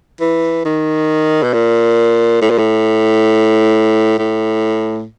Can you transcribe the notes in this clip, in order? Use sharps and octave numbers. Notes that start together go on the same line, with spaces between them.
E3
D#3
B2
A#2
A2
A#2
A2
A2